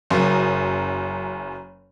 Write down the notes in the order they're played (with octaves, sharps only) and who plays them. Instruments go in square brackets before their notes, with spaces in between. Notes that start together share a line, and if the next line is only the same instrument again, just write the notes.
[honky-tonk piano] F#1 F#2